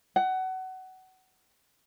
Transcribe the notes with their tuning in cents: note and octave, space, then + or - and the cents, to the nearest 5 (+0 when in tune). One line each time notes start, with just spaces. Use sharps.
F#5 +25